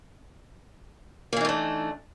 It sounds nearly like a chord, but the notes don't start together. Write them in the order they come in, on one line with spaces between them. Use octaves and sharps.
A#3 E3 D#4 A3 D4